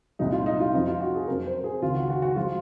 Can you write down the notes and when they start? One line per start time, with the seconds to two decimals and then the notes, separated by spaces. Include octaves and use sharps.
0.19 C2 A#2 F3 G#3 D#4
0.32 F4
0.46 D#4
0.60 F4
0.73 F2 C3 F3 D#4
0.87 F4
1.01 F#4
1.15 G#4
1.27 F2 C3 F#3 A#4
1.46 C5
1.60 A#4
1.64 G#4
1.82 C#2 C3 D#3 F4
1.95 F#4
2.10 F#4
2.22 F#4
2.36 F3 G#3 F4